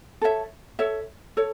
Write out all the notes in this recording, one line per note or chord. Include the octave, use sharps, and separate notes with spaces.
A4 C#5 E5
A4 C#5 E5
A4 C#5